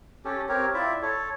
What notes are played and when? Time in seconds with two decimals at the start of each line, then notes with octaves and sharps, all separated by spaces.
0.25 C#4 G4 A4
0.49 C4 G4 A#4 C#5
0.74 E4 F4 D5 E5
1.02 A4 C#5